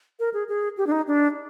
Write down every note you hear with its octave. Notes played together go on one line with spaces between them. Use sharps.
A#4
G#4
G#4
G4
D4
D#4
D4